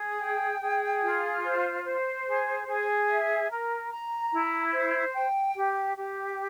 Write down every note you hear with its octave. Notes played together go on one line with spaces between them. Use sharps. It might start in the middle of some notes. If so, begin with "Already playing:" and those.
Already playing: G#4
G5
G#4
F4
C5
C5
G#4
G#4
E5
A#4
A#5
E4
C5
G5
G4
G4